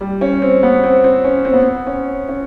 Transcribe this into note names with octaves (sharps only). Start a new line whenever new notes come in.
G3
C#4
C4
B3
C4
C4
C#4
C4
B3
C4
C#4
C#4